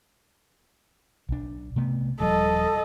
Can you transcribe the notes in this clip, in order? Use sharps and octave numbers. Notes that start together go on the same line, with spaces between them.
B1 D4
C3 A3 B3
D#1 F3 G3 A4 D#5